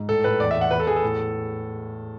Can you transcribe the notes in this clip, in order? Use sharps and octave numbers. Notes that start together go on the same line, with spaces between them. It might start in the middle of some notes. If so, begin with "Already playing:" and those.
Already playing: G#2
A2 A4
A2 B4
E2 D5
E5
E2
F#5
E2 B4
A4
E2 G#4
A4
A2